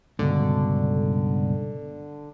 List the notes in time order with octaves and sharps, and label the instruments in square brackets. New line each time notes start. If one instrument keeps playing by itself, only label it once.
[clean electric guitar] C#2 G2 B2 [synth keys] D3